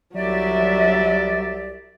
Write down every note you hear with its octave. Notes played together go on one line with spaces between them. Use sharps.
C2 F#3 G4 D5 E5